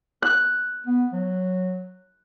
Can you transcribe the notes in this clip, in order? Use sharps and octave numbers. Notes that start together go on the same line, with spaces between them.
F#6
B3
F#3